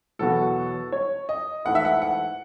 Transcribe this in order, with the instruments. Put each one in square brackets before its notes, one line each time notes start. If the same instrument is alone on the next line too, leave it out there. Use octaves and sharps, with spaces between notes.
[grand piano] E2 B2 F#3 B3 F#4 [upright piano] A4
[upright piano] C#5
D#5
[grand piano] G#2 E3 A3 E4 [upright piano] F#5
[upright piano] E5
F#5
F#5